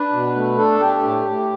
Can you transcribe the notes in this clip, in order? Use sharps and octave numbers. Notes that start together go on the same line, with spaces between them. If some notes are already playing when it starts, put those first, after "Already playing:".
Already playing: D4 B4
B2
A3
D4 A4
A3 G4
A2
A2